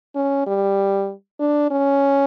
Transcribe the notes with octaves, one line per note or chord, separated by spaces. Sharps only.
C#4
G3
D4
C#4